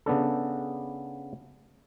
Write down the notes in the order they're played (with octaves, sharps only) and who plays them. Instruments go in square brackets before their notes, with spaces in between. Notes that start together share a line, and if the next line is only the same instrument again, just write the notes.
[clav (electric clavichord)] C#3 B3 D4 A4